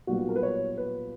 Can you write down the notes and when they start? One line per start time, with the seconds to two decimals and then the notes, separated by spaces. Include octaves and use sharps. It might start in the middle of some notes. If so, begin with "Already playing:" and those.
0.07 B1 A#2 G3 B3 F#4
0.29 A#4
0.36 B4
0.43 C#5
0.77 B4